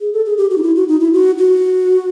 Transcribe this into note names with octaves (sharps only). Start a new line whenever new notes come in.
G#4
A4
G#4
G4
F#4
D#4
E4
F#4
D#4
E4
F#4
F#4